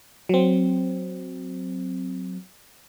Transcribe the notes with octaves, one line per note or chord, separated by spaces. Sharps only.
F#3 C4